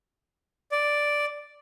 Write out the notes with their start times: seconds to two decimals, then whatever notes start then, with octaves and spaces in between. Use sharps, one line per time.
0.72 D5